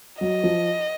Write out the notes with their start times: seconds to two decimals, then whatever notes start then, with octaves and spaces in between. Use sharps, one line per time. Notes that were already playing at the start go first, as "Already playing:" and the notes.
0.20 F#3 D#5
0.44 F3